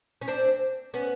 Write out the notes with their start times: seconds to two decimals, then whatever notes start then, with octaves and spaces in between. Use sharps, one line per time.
0.21 C#4
0.28 C4 D4
0.94 B3 C#4